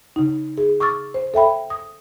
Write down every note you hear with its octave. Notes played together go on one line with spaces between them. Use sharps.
C#3 D#4
G#4
C#6 D6 E6 F6 A6
C5
A4 E5 G5 B5
D#6